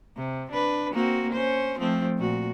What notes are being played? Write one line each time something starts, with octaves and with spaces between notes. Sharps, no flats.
C3
D4 B4
A#3 C4 F#4
C#4 C5
F3 A3 C4
A#2 F#4